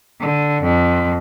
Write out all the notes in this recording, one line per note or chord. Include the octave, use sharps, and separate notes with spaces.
D3
F2